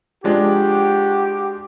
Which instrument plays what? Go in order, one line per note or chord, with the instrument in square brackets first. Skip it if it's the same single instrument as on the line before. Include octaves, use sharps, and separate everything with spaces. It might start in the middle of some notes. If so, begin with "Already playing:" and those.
[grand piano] F3 G#3 D4 [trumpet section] F#4 G4